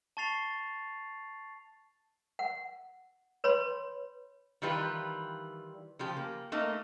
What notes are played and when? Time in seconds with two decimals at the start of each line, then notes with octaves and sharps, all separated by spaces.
0.17 A5 C#6 A6 C7 F7
2.39 F#5
3.44 B4 C#5 B5 C6
4.62 D#3 E3 G3 F4 B4
5.99 C#3 F3 G4
6.17 A#3
6.52 A3 A#3 D#4